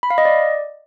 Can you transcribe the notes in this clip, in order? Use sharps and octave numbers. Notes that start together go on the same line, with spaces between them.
B5
F5
D#5
D5